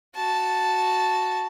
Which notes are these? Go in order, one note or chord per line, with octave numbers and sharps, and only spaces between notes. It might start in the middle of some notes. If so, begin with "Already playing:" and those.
F#4 A5